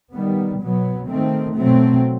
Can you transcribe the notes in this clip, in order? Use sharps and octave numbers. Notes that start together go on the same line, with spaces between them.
D#3 G3 B3
B2 F#3 B3
D#3 A3 C4
B2 F#3 A3 C4